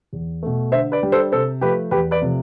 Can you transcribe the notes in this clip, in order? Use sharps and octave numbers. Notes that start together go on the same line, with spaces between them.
E2
B2 A3
D3 C5 E5
B4 D5
G3 D4
A4 C5
C3 A4 C5
F3 A3 G4 B4
E2 G4 B4
B4 D5
C3 F3 A3